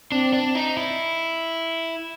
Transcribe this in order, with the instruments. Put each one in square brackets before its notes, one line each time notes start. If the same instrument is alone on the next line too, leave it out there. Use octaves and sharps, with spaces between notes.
[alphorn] C4 [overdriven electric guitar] D4
[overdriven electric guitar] D4
D#4
E4